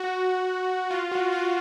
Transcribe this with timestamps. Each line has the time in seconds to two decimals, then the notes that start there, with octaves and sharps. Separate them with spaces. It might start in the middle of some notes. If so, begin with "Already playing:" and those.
Already playing: F#4
0.91 F4
1.12 F#4
1.32 F4